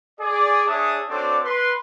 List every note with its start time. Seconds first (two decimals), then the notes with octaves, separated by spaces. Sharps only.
0.19 G#4 D5
0.66 D4 G#4 C#5 E5 A5 D#6
1.08 C4 D4 F#4 A4 C#5 D5
1.43 B4 C6